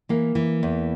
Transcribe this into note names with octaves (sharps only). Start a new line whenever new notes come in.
E3 A#3
E3
E2